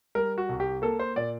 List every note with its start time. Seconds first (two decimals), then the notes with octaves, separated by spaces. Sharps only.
0.15 G3 A#4
0.38 F#4
0.49 C2
0.60 G4
0.82 A#3 A4
0.99 C5
1.16 A#2 D5